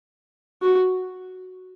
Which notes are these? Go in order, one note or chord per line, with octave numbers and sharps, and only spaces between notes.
F#4